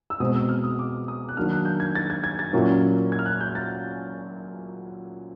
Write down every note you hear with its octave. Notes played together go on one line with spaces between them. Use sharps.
E6
B2 G#3 C4 D#6
E6
F6
D#6
D6
D#6
F#6
D#3 F#3 A#3 D4 F6
F#6
G6
G#6
A6
G#6
G#6
A6
A#2 F#3 A#3 C#4 E4
G#6
F6
F#6
G6
A6